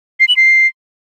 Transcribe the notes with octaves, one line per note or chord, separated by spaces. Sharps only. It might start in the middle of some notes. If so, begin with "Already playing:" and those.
C7
F#7
C7